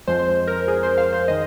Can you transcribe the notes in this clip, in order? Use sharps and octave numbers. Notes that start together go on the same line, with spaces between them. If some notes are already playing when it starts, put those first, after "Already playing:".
F2 F3 G#3 C5
A#4
G#4
C5
F5
C5
D#3 G#3 D#5